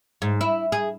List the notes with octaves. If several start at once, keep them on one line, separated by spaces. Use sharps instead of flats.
G#2
E4
G#4